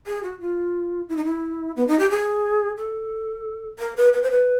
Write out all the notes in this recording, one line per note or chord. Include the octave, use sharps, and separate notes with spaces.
G#4
F#4
F4
E4
D#4
E4
B3
D#4
G4
G#4
A4
A#4
B4
B4
C5
B4